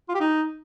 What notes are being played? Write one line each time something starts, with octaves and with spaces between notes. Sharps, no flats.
F4
G4
D#4